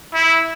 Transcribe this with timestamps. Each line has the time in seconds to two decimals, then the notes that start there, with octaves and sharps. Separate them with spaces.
0.14 E4